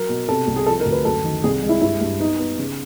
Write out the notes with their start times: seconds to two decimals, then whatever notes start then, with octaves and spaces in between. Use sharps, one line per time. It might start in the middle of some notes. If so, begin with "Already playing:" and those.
Already playing: F#3 A#4
0.09 B2
0.28 C3 A4
0.47 C2
0.56 G#4
0.66 F3 A4
0.80 A#4
0.86 D2
0.92 B4
1.05 F#2 A4
1.24 D#3
1.44 C2 G#4
1.63 G#3
1.69 E4
1.81 G2 E4
2.01 G2
2.20 B3 D#4
2.39 B3
2.59 C#3